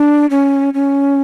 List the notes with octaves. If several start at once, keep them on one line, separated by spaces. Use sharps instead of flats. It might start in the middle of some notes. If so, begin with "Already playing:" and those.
Already playing: D4
C#4
C#4